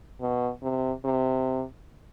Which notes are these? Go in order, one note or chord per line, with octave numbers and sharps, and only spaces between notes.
B2
C3
C3